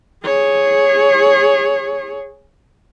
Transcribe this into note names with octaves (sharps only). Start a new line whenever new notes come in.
G#4 C#5